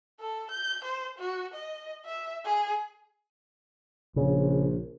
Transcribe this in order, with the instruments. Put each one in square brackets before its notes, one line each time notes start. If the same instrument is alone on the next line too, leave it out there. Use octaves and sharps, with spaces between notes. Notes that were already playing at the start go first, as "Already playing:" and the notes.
[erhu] A4
G6
C5
F#4
D#5
E5
G#4
[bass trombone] A#1 [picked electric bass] C#3